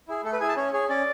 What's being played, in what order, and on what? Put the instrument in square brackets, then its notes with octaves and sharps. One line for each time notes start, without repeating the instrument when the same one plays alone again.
[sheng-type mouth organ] E4 G#4
A3 A4
B4
E4 G#4 G#5
A5
C#4 C#5
G#4 C#5
C#4 D5